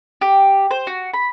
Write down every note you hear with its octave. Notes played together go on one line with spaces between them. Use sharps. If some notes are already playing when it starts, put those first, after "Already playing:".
G4
C5
F#4
B5